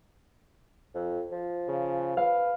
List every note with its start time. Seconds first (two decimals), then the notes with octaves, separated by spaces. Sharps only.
0.95 F2
1.32 F3
1.69 C#3
2.17 B4 F5